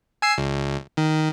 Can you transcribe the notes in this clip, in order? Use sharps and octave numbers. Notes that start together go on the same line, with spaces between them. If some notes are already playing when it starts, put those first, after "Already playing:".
G#5 E6 C7
C#2
D#3